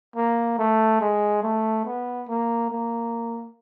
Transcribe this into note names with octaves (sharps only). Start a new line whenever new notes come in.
A#3
A3
G#3
A3
B3
A#3
A#3